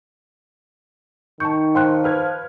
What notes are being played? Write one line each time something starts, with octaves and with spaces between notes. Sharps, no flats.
D#3 A5 C#6 G6
F3 G5 C6 F#6
B4 F6 G#6